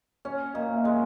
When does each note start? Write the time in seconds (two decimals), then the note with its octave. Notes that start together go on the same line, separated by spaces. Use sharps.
0.25 C#4 C#5
0.54 A#2 D#5
0.76 E5
0.84 G#3 D#5